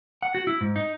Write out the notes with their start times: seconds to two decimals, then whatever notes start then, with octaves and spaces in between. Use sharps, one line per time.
0.22 F#5
0.35 F#4
0.47 E4
0.61 G#2
0.76 D#4